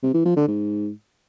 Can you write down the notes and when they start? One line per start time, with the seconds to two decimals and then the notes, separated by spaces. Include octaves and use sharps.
0.03 C3
0.14 E3
0.25 F3
0.37 D3
0.48 G#2